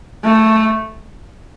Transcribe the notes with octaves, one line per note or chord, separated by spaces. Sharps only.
A3